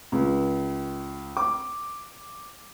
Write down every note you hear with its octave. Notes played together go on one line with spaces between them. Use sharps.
C#2
D6